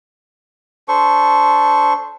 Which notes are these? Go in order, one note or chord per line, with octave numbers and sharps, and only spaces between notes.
D4 A4 C5 C#6